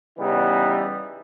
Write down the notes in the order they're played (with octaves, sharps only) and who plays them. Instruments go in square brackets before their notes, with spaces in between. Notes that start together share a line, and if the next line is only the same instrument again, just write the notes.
[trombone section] C#3 E3 G3 B3 D#4 E4